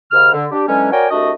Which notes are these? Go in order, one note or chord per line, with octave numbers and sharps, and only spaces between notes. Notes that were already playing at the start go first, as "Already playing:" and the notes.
D#2 G#2 C#3 F6
D3
D4 G4
D3 E3 F#3 G#3 C#4
F#4 A#4 C#5 D5 G5 G#5
C2 A3 D4 F#4 D#5